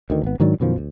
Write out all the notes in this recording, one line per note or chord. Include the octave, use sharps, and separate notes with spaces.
D2 D#3
G#1 B3
G#2 D#3 F#3 D4
F#2 B2 D#3 F3
D2